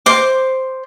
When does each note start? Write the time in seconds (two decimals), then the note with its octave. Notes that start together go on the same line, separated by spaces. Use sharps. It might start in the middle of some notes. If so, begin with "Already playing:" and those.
0.06 C5 D6